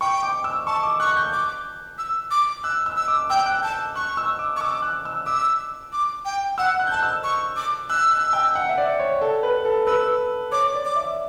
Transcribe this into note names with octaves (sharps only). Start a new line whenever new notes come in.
G5 C#6
D6
E6
A5 C#6
D6
C#6 F#6
F#6
G6
D6
E6
D6
E6 F#6
E6
E6
D6
G5 E6
F#6
A5 G6
C#6 F#6
E6
D6
C#6
D6 E6
F#6
E6
D6 E6
D6
G5
F#5 E6
F#6
G6
A5 F#6
E6
C#6
D6
E6 F#6
F#6
G5
F#5
E5
D5
C#5
A4
B4
A4
B4 E6
C#5 D6
D5
D6
E5